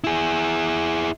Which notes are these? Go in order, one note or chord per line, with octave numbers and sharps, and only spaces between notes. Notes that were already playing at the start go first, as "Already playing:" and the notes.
E4 G#4